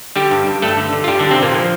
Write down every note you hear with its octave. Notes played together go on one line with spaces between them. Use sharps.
D3 G3 G4
G2
G2
G2 A3 A4
D3
D3
F4
G2 G3 G4
G2 D3 D4
C3 C4
A#2 D3 A#3
F3